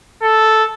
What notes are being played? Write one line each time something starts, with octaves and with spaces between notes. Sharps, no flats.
A4